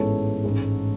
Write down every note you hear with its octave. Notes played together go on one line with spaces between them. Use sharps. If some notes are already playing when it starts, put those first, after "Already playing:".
Already playing: A1 G#2 G#3 B3 E4 A4 C#5
A1 G#2 G#3